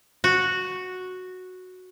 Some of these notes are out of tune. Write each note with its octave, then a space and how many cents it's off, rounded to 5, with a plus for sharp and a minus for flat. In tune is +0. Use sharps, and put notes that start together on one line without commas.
F#4 -5